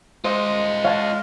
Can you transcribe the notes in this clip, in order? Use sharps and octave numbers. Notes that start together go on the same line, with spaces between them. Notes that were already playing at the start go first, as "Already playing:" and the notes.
G#3 F4 C5 D#5
C#5 F5 F#5 A5